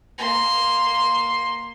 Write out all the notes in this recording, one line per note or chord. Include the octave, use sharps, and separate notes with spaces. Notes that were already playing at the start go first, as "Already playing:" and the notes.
A#3 C6